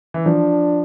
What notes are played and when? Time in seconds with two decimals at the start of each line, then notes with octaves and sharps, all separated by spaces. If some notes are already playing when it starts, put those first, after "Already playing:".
0.14 E3
0.25 F3 D4